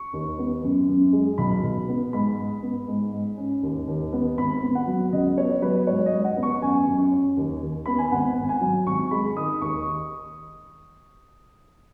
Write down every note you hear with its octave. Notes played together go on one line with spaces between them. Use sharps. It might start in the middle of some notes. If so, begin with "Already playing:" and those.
Already playing: C#6
D#2
B3
F#2
F#2
G#3
B1 B5
B1
B3
G#2 B5
G#2
B3
G#2
G#2
C#4
D#2
D#2
B3
G#1 B5
B3
F#5
F#3
C#2 D#5
B3 C#5
F#3 B4
G#2 C#5
D#5
G#2
F#5
B3
C#6
F#2 G#5
F#2
C#4
D#2
D#2
B3 B5
G#5
G#1 F#5
G#1
G#5
F#3
G#1 C#6
G#3 B5
D#3 D#6
D#2 C#6